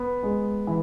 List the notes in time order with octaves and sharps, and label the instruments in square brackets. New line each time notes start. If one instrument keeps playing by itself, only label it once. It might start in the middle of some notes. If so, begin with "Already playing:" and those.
Already playing: [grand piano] B3
G#3
E3